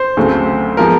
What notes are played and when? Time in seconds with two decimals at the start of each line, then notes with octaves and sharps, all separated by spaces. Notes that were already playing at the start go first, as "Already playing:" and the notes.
Already playing: C5
0.17 D2 C#3 F#3 A3 C4
0.77 F3 G#3 B3 A#4